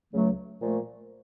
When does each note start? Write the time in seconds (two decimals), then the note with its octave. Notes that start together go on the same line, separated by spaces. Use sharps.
0.14 C#2 C#3 F#3 A3
0.62 A#2 F3 A3